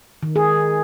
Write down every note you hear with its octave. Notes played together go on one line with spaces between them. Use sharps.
D#3
G#4